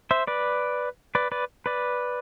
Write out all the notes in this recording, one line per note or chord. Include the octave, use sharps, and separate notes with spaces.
C5 E5
B4 D5
B4 D5
B4 D5
B4 D5